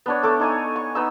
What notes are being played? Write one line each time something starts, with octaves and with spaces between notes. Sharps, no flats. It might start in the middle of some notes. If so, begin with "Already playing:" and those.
B3 D4 C#5
A3 A4 D6
D#4 C#5 G#5
C#6
B3 D#4 E6